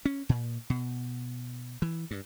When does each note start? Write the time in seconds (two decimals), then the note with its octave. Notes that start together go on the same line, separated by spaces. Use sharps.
0.05 C#4
0.29 A#2
0.70 B2
1.82 E3
2.11 G2